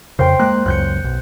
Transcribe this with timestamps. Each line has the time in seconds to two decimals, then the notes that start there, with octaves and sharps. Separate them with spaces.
0.19 F2 C#3 C5 G5 C6
0.39 G#3 A#3 F#6
0.66 C#2 F#2 F#6 G6 C#7
1.04 B1